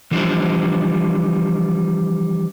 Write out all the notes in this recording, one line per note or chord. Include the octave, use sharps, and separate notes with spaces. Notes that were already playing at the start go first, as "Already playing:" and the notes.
E3 F3 G3 D4 F4 C5